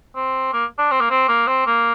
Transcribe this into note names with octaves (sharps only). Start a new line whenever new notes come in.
C4
A#3
D4
C4
A#3
C4
A#3
C4
A#3